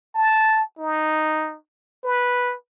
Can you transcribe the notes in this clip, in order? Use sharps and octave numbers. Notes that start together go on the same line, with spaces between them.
A5
D#4
B4